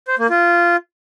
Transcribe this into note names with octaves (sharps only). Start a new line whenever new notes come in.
C5
A#3
F4